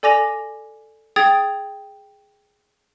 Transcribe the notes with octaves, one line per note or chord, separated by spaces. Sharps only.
A4 D5 G#5 D6 A#6 F7
G#4 G5 D#6 G#6 A6